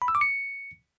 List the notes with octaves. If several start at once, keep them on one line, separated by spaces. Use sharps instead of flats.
B5
E6
D6
C#7